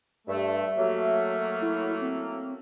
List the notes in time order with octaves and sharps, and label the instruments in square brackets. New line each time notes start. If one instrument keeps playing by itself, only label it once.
[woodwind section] G2 A3 [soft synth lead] E5
[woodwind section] F#3 A3 A#3
[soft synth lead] E4
C4